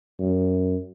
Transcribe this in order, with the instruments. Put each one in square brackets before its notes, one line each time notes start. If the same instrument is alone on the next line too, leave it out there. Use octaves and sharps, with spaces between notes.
[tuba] F#2